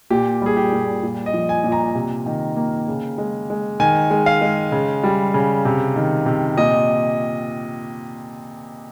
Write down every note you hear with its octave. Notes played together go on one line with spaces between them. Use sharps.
A#2 G4
G3 G#4
G4
A#2
A#2
D#5
F3
G#5
A#2
A#5
C3
D#3
A#3
C#3
G#3
G#3
D#3 G#5
G#3
F5
G#3
C#3
G3
C#3
C3
D#3
C3
A#2 D#5